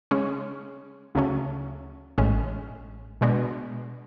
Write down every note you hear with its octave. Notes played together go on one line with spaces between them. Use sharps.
C#3 G#3 C#4 G#4
D2 C#3 F#3 A3 C#4
A1 A2 G#3 C#4
B2 G#3 B3 D4 F#4